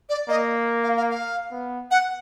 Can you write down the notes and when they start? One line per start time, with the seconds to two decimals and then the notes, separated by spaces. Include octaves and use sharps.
0.09 D5
0.29 A#3 D#5
0.84 F5
0.97 F5
1.11 F5
1.51 B3
1.91 F#5